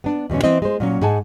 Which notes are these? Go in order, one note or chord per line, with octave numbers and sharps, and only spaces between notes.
B3 D4
E2 B2 D3 C#4
E3 C4 E4 C5 D#5
G#3 C5
A#2 F#3 C#4
G#2 G#4 F#5 G#5 A5